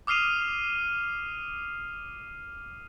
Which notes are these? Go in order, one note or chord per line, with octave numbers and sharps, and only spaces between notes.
D6 D#6 F6 C7 D#7 F7